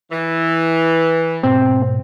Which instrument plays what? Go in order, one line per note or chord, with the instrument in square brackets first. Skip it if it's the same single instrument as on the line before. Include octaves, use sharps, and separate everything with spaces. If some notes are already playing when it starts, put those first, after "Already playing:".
[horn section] E3
[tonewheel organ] G#2 B2 [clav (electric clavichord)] C4